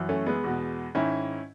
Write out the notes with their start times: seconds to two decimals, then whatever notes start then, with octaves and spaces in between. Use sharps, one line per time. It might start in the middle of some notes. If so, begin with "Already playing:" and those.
Already playing: F#2 E3
0.09 A3 C#4
0.26 G#3 B3
0.44 E2 B2
0.95 G#2 D#3 C#4 E4